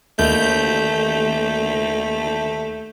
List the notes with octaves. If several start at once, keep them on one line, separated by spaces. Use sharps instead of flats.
D#2 A3 G6